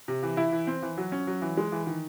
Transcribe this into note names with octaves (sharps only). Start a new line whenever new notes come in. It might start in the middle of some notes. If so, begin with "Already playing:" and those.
C3
E3
E4
E3
C4
E3
F#3
C#4
F#3
E3
G#3
E3
D#3